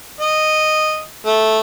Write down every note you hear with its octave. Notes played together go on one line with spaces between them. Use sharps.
D#5
A3